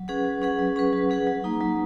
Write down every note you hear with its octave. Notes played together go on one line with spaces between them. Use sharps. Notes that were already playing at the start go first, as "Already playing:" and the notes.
Already playing: F#3
C#4 G#4 B4 F#5
F#3
C#4 G#4 B4 F#5
F#3
C#4 G#4 B4 F#5
F#3
C#4 G#4 B4 F#5
F#3
A#3 D#4
F#3